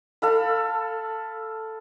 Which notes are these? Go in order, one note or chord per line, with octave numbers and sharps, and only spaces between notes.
A4 F5 B5